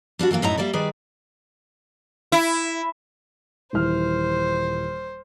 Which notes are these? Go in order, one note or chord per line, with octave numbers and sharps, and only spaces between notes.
G3 D4 E4 F#4
E3 F#3 A#3 F4
F#2 A2 D#4 E4 F#4 A#5
G3 A#3 D5 E5
D#3 G3 G#4 B4 D5
E4
D#1 E3 C5 F6